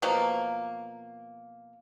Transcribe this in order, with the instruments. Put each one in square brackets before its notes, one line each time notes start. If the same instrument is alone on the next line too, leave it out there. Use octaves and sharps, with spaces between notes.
[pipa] B2 F3 F#3 A#3